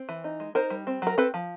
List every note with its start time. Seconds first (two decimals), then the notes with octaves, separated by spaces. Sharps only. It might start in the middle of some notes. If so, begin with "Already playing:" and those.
Already playing: C4
0.09 E3
0.24 D#4
0.40 G#3
0.55 D#4 A#4 C5
0.70 G3
0.87 C4
1.02 F#3 A#4
1.18 C4 A4 B4
1.34 F3